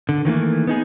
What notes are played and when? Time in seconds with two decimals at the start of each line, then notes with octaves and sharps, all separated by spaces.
0.09 D3
0.25 D#3 E3 A3 A#3
0.67 B3 D#4 G#4